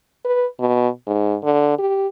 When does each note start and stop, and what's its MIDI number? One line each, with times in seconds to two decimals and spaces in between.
0.25 0.46 71
0.60 0.88 47
1.07 1.36 44
1.44 1.76 50
1.78 2.07 67